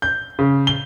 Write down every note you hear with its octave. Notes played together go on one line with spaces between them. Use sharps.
G6
C#3
G7